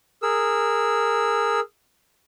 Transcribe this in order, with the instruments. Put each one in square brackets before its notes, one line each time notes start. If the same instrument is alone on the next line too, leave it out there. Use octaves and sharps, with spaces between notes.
[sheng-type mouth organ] G#4 A#4 E6